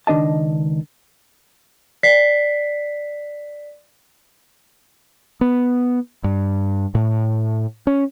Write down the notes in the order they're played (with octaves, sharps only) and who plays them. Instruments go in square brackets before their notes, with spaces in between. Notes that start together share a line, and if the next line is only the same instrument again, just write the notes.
[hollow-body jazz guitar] C#2 D#3 D4 D#5 A5
[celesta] D5 B6 C7
[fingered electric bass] B3
G2
A2
C#4